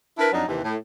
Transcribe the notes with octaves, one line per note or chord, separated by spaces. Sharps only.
D4 E4 A#4 B4
F2 F#3 D4 D#4
D#2 C3 D#3 E3
A2